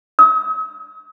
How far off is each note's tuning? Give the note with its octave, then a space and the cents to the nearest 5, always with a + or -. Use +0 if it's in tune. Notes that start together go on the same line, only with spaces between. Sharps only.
D#6 +45